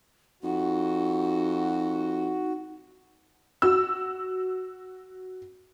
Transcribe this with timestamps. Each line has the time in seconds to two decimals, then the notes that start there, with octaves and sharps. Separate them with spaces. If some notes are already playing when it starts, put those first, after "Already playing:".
0.43 F2 D#4 F#4
3.62 F#4 E6